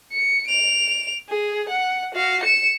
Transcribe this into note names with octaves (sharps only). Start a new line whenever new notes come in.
C#7
D7 F7
G#4
F#5
F#4 F5
C#7 E7